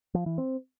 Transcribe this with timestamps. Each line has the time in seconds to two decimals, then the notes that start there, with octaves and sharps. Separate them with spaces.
0.14 F3
0.26 E3
0.38 C4